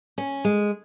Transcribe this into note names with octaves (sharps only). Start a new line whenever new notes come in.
C#4
G#3